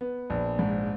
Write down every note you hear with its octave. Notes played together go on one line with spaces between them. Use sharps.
B3
A#1
G#2